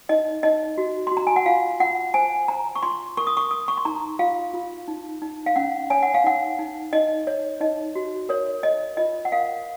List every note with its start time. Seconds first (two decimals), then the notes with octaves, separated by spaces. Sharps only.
0.09 D#4 D#5
0.43 D#4 D#5
0.78 F#4
1.07 F#4 C6
1.17 A#5
1.27 G#5
1.36 F#5
1.46 F4 F5
1.80 F4 F#5
2.14 C5 G#5
2.48 C5 A#5
2.76 C#6
2.82 F4 C6
3.17 A#4 C#6
3.27 D#6
3.37 C#6
3.51 A#4 D#6
3.68 C#6
3.77 C6
3.85 D#4 A#5
4.19 F4 F5
4.54 F4
4.88 D#4
5.22 D#4
5.46 F5
5.56 C#4 F#5
5.90 C#5 G#5
6.03 F#5
6.14 F5
6.24 D#4 F#5
6.59 D#4
6.93 D#4 D#5
7.27 C#5
7.61 D#4 D#5
7.95 F#4
8.29 A#4 C#5
8.63 C#5 D#5
8.97 F4 D#5
9.25 F#5
9.32 A#4 F5